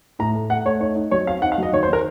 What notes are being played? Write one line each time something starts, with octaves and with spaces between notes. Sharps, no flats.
A2 A#5
A3
A3 F#5
A3 C#5
D#4 C#5
D#4
F#3 C#5
C4 F5
D#4 F#5
F5
F#3 D#5
D#3 C#5
C5
D#3 A#4